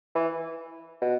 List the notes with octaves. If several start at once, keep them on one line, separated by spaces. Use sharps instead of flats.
E3
B2